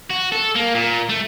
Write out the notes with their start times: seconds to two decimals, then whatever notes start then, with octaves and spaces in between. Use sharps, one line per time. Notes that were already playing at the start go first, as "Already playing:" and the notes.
0.11 F#4
0.32 A4
0.55 A#3
0.75 A#2
1.09 A3